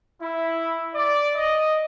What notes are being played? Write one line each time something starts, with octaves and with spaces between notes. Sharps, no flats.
E4
D5
D#5